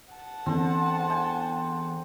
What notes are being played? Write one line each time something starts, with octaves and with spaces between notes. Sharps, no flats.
F#5 A5
E2 D3 C4
G5 G#5